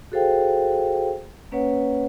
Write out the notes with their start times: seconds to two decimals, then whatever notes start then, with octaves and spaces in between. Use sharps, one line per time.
0.12 F#4 G#4 A4 C5 F5 G5
1.52 A#3 C#4 B4 C#5 F#5